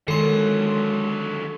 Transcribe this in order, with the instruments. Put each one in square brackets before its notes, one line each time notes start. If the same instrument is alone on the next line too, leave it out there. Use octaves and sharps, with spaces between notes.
[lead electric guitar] D3 F#3 [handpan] D#3 [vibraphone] G#3 [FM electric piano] A4 C6